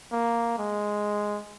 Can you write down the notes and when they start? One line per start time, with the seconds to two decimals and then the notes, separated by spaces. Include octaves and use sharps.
0.12 A#3
0.57 G#3